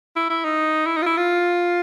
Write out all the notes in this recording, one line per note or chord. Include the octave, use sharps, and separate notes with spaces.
E4
E4
D#4
E4
D#4
F4
E4
F4